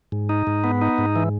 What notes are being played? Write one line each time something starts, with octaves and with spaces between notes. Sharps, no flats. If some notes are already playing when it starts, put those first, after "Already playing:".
G#2
D#4
G#2
B3
D#4
G#2
E3